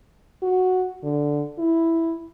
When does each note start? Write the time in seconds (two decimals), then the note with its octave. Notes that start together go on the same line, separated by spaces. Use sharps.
0.42 F#4
1.03 D3
1.58 E4